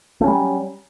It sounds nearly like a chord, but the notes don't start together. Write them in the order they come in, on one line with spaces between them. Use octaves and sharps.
A3 C#4 G3 F#3